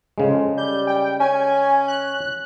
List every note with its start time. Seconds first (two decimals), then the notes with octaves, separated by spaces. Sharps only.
0.18 F2 C#3 G#3
0.58 G3 G6
0.87 G5
1.20 C#4 G#5
1.88 F#6